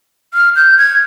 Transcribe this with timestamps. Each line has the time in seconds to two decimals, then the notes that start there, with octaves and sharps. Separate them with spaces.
0.34 F6
0.56 G6
0.78 G#6